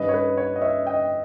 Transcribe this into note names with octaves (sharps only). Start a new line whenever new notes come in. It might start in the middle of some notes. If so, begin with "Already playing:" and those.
Already playing: G2 D#3 G3 C#4 B4 D#5
C#5
B4
C#5
D#5
C#5 E5
D#5 G5